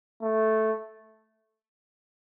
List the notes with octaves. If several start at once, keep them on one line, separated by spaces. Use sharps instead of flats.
A3